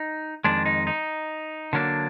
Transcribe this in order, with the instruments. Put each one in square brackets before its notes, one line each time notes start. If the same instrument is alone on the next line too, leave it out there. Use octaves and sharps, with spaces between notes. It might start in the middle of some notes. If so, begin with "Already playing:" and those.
Already playing: [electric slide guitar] D#4
F2 D#3 G#3 D4
D#4
D#4
D3 F#3 A#3 D4